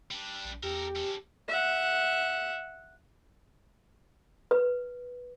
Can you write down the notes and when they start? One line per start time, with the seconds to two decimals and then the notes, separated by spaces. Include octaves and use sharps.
0.11 G3 D4
0.44 A#1
0.63 E2 G4 A4 A#4
0.96 C#4 A4
1.49 E5 F#5
4.51 B4